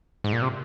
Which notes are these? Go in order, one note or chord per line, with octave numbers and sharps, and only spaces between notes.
G#2
A#2
C3